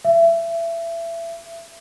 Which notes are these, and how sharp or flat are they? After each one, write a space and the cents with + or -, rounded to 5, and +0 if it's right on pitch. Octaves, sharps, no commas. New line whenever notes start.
E5 +25